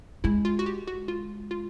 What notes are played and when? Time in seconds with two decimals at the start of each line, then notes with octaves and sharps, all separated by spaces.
0.24 G#3 E4
0.45 F4
0.59 F#4
0.66 G4
0.87 F#4
1.08 F4
1.51 F4